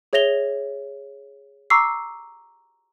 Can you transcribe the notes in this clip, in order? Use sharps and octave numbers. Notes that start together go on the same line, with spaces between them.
G#4 C#5 E5 A#6 F7 G7
A#5 C#6 D6 E6 C7